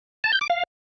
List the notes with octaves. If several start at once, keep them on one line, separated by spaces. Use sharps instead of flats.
A5
G6
D6
F5